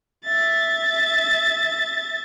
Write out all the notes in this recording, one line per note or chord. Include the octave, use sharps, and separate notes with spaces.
E5 A6